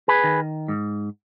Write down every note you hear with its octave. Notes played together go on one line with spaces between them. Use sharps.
G#4 B4
D#3
G#2